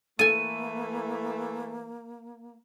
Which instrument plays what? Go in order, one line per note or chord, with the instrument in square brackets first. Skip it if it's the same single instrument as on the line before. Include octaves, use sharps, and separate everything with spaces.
[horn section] E3 A3 [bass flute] A#3 [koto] A4 G#5 [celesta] D#7